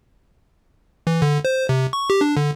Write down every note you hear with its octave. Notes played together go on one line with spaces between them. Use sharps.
E3
D3
C5
C3
C#6
G4
D4
D3